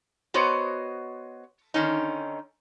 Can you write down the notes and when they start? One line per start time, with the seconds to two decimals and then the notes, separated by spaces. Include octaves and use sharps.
0.34 B3 F#4 C5 C#5 D#5
1.74 D3 D#3 C#4 D#4